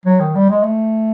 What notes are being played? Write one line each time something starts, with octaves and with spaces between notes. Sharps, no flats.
F#3
D#3
G3
G#3
A3